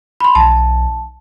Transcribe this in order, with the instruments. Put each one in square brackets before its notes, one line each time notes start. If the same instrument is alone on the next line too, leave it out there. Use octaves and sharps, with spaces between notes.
[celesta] B5 C6
[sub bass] B1 [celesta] A5